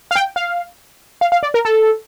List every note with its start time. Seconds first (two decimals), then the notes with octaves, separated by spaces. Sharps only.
0.11 F5
0.16 G5
0.36 F5
1.21 F5
1.32 F5
1.43 D5
1.54 A#4
1.65 A4